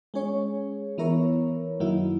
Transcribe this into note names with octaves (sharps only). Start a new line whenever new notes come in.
G#3 C#4 G#4 C#5
E3 B3 E4 A#4 C#5
F#2 D#3 F#3 A#3 E4